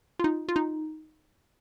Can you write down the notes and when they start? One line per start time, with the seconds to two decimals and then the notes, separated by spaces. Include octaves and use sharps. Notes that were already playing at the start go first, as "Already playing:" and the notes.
0.19 F4
0.24 D#4
0.49 F4
0.56 D#4